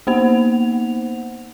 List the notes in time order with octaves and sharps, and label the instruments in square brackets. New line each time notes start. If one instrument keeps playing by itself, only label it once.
[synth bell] A#3 B3 D#4 C5 F#5 F7